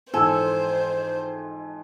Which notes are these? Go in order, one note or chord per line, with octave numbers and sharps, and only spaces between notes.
F2 G#2 E3 A4 C5 G#5